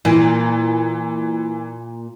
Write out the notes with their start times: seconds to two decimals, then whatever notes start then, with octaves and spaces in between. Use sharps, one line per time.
0.05 A#2 E3